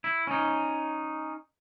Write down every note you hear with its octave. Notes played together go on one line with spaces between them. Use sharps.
E4
C#4 D#4